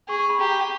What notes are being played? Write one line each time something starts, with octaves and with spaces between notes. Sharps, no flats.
G#4 C#6
C#6
B5
G4 A#5